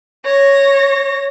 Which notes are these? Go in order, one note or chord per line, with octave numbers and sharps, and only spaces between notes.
C#5 A#6